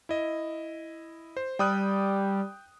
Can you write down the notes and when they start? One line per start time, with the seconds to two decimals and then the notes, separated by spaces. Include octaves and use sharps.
0.09 E4 D#5
1.37 C5
1.59 G3 G5 D#6 F#6